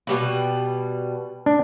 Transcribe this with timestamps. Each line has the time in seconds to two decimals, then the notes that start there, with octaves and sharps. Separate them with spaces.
0.07 B2 G3 B4
1.46 D4